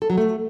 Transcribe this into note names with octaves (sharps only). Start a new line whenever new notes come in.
A4
F#3
A3